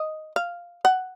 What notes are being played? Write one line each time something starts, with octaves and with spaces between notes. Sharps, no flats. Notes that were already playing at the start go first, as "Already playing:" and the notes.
Already playing: D#5
F5
F#5